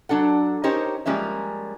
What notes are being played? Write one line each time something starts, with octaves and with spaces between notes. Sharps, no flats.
F#3 D4 A4 F#5
C#4 D#4 G4 A#4 C5 C#5
F3 G3 G#3 A#3 C#4 E5